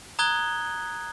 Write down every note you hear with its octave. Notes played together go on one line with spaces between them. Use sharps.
A#5 D#6 F#6 G#6 G7